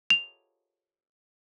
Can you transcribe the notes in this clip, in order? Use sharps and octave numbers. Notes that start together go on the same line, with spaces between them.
F7